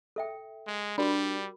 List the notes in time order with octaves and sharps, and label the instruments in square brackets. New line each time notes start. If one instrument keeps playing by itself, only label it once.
[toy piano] A4 E5 G5
[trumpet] G#3
[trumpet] G3 [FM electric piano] D4 [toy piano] F#4 A#4 B5